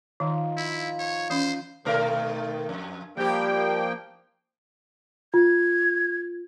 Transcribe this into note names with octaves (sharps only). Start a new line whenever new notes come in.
D#3 F3 D#4 F4
E4
C#5
E3 C#4 C5
B2 D#3 A3 A#4
F2
F3 G3 A#3 G4 G5
F4 G#6